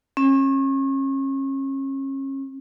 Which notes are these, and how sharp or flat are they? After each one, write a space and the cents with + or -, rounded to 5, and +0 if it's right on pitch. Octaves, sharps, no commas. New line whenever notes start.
C#4 -35